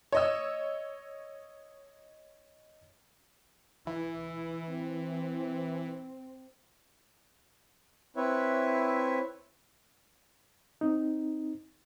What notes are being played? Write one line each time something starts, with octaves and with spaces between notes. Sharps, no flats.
C#5 D#5 E6
E3 E4
C4
C4 E4 B4 C#5 E5
C4 D#4